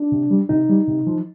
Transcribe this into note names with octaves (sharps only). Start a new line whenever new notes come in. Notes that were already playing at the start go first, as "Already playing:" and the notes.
Already playing: D4
C3
G3
C3 D#4
G3
C3
F3